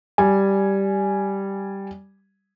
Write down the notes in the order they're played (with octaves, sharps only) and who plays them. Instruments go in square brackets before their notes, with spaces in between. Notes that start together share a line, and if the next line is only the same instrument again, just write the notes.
[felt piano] G3 G#5